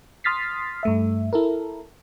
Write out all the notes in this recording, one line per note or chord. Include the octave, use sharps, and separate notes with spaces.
C6 D#6 F6 A6 B6 C7
G2 A3 E5
E4 A4 A#4